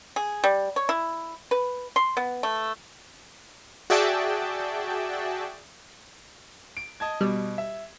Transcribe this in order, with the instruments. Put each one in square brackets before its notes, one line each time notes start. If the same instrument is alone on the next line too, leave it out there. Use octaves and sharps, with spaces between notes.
[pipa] G#4
G3
C#5
E4
B4
C6
B3
A3
[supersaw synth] F#4 G#4 D5 E5 G5 A5
[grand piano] D7
D#5 A5 G#6
[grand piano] B2 [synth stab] G3
[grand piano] E5